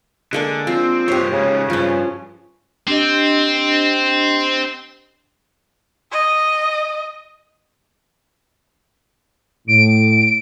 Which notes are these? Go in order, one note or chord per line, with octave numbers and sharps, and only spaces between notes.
D3 G#3 A#3 D4
F3 C4
G2 G4 C5 C#5
G#2 C#3 C#4
G2 F3 C#4
C4 D4 G4 D#5
D#5
A2 D7